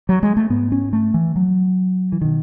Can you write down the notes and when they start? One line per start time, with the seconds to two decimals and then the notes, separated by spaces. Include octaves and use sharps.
0.09 F#3
0.23 G#3
0.37 A3
0.50 G#2 B3
0.72 C#4
0.93 A3
1.14 E3
1.36 F#3
2.12 E3
2.21 B2 D#3